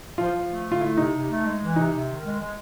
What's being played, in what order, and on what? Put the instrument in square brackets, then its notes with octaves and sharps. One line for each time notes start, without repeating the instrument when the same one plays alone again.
[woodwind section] F3 [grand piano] F4
[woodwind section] F3
A3
D3
[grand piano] F4
[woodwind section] A3 [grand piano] E4
[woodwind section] C3 [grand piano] D#4
[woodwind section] C3
A3
G#3
E3
[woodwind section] C3 [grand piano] D#4
[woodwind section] C3
D#3
G#3
G#3